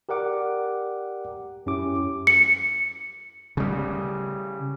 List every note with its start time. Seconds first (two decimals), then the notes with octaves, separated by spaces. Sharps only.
0.09 G4 A#4 D5 F#5 D6
1.66 F#2 C#4 E4 G4 D6
2.27 C#7
3.57 C#3 G3